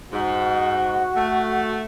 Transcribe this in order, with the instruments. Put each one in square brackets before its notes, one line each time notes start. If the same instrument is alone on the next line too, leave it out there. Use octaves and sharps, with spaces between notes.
[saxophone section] G#2 [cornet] F#4
[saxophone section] A3